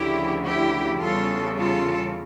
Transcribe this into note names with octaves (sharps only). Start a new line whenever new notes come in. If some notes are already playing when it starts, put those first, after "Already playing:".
Already playing: D2 C#3 F3 E4 G4
E4 G4
E2 C#3 G3 F4 A4
F4 A4